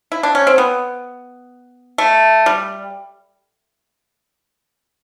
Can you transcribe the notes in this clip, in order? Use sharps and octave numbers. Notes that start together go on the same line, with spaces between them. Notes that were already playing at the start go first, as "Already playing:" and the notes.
E4
D4
C#4
C4
B3
A3
G3